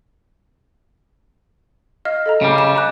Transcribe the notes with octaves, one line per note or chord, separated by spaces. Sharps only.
D#5 F5 F6
A4 D#5 A#5
C#3 G3
D#5 E7
A#5 D6 F#6